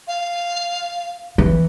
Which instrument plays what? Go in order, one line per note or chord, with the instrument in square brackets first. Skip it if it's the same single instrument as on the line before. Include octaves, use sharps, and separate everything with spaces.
[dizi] F5
[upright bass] E3